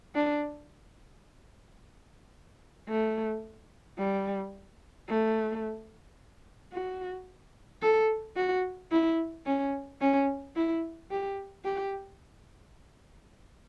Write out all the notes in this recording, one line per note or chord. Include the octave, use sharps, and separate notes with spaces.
D4
A3
G3
A3
F#4
A4
F#4
E4
C#4
C#4
E4
G4
G4